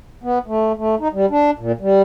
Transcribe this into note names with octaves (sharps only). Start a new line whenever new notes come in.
B3
A3
A3
D#4
G3
D4
A#2
G3